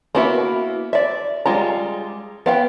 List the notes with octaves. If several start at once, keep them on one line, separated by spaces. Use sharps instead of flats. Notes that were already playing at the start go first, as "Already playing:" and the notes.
A#3 B3 E4 F#4 E5
D5 E5
G3 G#3 F4 A#5
B3 F5 G5